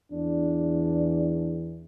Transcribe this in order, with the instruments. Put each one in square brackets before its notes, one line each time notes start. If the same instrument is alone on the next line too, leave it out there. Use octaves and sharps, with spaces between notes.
[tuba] E2 [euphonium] D4